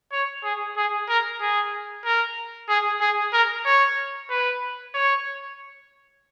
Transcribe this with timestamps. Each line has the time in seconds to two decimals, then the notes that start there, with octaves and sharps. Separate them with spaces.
0.12 C#5
0.43 G#4
0.76 G#4
1.09 A#4
1.40 G#4
2.04 A#4
2.69 G#4
3.00 G#4
3.33 A#4
3.65 C#5
4.30 B4
4.94 C#5